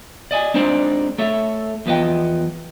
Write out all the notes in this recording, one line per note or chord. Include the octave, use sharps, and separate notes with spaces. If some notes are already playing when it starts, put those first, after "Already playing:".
D5 D#5 G#5
G#3 C4 D4 D#4 C5 D5
A3 A4 C#5 E5
E2 F3 B3 D#5 G5